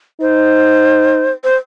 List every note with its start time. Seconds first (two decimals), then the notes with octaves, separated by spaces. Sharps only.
0.21 D#4 C5
1.44 C5